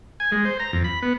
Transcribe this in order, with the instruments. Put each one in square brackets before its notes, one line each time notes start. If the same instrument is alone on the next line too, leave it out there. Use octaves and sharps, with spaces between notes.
[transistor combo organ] G#5
G#3
C5
A#5
F2
B5
B3